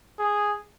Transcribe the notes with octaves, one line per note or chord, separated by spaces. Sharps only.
G#4